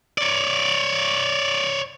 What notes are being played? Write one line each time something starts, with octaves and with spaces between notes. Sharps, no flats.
C#5 D5